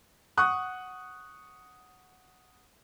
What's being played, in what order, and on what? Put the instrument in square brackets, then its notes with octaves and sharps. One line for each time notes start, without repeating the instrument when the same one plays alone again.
[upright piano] F#5 C#6 D#6 F#6